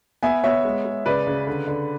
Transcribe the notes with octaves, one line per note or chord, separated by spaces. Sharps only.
B3 E5 G#5
B3 C#5 E5
G#3
G#3
C#3 B4 D5
C#3
D3
D3